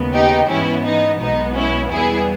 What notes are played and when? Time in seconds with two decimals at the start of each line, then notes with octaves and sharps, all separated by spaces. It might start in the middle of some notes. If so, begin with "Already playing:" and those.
Already playing: D#2 C#3 G#3 B3
0.14 D#4 G4
0.50 G#2 E3 G#3 B3 C#4 E4
0.85 D#4
1.21 B1 B2 G#3 B3 D#4
1.56 C#4 E4
1.91 E2 B2 G3 B3 E4 G#4